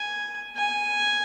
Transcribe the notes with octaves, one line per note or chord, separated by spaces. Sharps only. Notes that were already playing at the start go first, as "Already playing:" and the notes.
Already playing: G#5
G#5